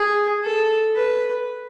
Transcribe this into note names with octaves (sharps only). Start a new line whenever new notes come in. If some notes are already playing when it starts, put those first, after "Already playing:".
Already playing: G#4
A4
B4